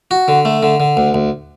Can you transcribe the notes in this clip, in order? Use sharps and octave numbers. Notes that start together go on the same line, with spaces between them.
F#4
D3
A3
D3
D3
D2
D2